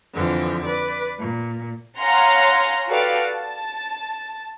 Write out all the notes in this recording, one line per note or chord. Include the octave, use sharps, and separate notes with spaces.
F2 D3 E3 F3
B4 D5
A#2
C#5 F5 F#5 G#5 A#5 C6
F#4 G4 A4 B4 D5 F5
A5